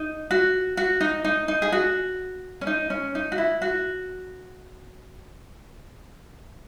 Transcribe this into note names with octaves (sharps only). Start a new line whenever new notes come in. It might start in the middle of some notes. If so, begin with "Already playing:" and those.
Already playing: D#4
F#4
F#4
D#4
D#4
D#4
G#4
F#4
C#4
D#4
C#4
D#4
F#4
E4
F#4